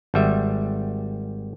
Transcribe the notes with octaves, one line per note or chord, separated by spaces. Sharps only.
G#1 G3 E5